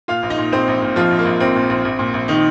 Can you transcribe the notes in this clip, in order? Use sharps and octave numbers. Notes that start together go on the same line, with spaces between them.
A#2 F4 F5
A#1
D#4 D#5
A#2
A#1 C4 C5
A#1
A#2
A#1 F3 F4
A#1
A#3
A#1
A#1 C4
A#2
A#1
A#1
A#2
A#1
D#3 D#4